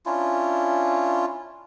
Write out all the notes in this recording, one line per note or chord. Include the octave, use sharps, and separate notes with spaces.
C#4 D4 E4 F4